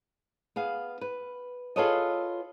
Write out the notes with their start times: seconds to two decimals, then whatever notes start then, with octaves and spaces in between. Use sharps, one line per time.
0.56 B3 G#4 F5
1.01 B4
1.76 F4 G#4 A4 B4 C#5 D#5